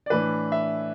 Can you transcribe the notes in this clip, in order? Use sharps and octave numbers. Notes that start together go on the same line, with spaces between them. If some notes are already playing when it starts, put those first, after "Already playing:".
D5
A2 E3 D4 B4
E5